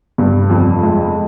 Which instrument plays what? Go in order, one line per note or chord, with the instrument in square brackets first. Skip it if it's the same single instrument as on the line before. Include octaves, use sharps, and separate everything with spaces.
[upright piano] G2
F2
G#3